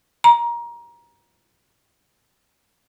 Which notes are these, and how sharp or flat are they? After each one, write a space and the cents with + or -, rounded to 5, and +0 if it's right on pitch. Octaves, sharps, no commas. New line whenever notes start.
A#5 +20